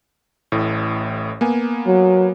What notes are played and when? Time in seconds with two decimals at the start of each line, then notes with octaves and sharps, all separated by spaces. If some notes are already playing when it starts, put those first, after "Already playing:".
0.52 A1 A2
1.41 A#3 B3 G#5
1.87 F#3